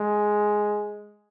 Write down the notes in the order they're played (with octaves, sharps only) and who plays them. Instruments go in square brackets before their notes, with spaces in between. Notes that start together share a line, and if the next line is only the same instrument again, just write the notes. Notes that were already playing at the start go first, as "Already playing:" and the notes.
Already playing: [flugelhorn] G#3